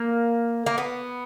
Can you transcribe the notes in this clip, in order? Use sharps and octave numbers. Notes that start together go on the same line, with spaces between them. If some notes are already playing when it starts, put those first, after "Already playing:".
Already playing: A#3
A#3
B3